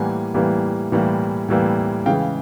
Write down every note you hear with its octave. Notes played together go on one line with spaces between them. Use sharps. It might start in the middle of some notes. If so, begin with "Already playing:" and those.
Already playing: A2 E3 G3 A#3 F#5 G#5
A2 E3 G3 A#3
A2 E3 G3 A#3
A2 E3 G3 A#3
C#3 E3 G#3 F5 G5